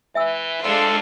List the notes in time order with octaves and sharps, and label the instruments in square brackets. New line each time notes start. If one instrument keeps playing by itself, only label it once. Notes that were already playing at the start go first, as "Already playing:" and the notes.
[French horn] E3 [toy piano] E5 G#5 E6
[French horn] F2 [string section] G#3 D4 F4 [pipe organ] A4